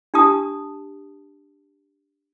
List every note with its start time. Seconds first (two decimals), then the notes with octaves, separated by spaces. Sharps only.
0.14 D4 G4 A5 D#6